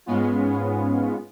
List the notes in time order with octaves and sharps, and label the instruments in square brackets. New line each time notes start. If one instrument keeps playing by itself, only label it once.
[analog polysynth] G#2 G#3 B3 C#4 F4